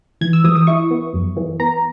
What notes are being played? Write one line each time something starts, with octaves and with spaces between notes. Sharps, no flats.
E3 G#6
E6
E3 D#6
D#6
E4 C#6
B3
F#2
E3
B3 A#5